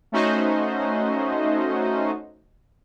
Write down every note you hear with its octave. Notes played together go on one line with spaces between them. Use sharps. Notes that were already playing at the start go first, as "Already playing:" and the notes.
A3 C#4 D#4 F#4 C5 D#5